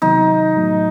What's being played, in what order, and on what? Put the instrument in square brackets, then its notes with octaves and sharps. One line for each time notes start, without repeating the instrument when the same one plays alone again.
[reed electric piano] C3 D#3 F#3 B3 [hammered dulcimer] D#4
[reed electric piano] A2 F#3 A3